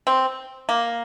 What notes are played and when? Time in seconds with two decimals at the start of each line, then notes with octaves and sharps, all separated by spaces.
0.07 C4
0.69 A#3